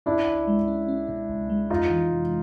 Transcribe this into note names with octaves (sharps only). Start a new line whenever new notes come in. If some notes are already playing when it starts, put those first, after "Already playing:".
C#4 D4 E4
C#2
G#3
C#4
C#4
B2
C#2
G#3
F2 D#4 F4
E3
C3